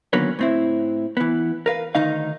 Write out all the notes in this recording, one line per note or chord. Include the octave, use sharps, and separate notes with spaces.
D3 D#3 F#3 A#3 B3 C#4
A2 C4 E4
E3 B3
A#4 B4 F5
D2 D#3 D#4 F5